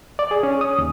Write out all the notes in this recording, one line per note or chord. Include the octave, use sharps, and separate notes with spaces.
D5
G#4
C#4
D#6
D#2